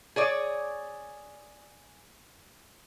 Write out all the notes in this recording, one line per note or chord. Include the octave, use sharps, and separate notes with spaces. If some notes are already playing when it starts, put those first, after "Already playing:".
G#4 C#5 D5